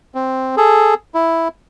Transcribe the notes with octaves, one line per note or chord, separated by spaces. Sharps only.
C4
G#4 A4
E4